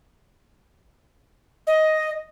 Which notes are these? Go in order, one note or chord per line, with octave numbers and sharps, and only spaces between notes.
D#5